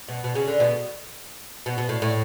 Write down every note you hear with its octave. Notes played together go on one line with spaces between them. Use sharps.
B2
B2
C#3
D3
B2
B2
B2
A2
A2